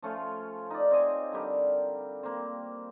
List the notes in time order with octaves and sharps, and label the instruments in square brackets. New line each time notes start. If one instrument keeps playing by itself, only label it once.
[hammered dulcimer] F3 A3 C#4 F4
D#4 D5
C4 C#5 D#5 G#5
D3 G3 G4 A#4
A#3 C4